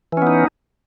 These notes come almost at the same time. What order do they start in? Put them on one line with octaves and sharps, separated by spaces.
E3 C#4 B3 D#4